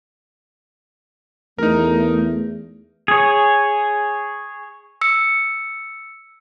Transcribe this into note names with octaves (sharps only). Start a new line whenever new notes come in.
E2 A3 D#4 A#4
G#4 C#5
E6 C#7